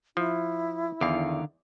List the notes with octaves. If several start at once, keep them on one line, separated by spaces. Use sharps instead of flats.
F3 E4
E2 D3 D#3 F5